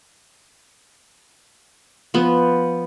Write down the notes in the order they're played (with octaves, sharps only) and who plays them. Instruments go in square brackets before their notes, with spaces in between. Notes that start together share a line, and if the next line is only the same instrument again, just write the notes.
[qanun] F3 B3